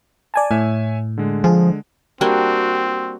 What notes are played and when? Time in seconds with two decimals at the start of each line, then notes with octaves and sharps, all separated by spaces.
0.34 D5 G#5 A5
0.51 A2 C#5 E5 G#5
1.18 D3 G#3
1.44 F3 G#4
2.21 G3 A#3 C4 D4 F#4